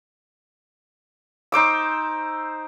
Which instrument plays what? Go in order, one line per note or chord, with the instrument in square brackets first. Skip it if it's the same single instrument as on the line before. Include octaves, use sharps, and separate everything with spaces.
[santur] D#4 C5 D6 E6